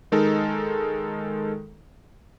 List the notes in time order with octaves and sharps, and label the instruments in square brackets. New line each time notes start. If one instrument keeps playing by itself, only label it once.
[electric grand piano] D#3 G#3 D#4 A4 A#4